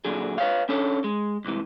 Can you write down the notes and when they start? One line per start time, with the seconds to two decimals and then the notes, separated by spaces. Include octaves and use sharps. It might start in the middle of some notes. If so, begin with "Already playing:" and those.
0.05 A#2 D3 F#3 G#4
0.38 B4 C#5 F5
0.69 C#4 D4 A4 C#5
1.04 G#3
1.45 C2 G#2 C3 E3